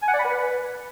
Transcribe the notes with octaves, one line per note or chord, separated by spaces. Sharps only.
G#5
F#5
D5
B5
B4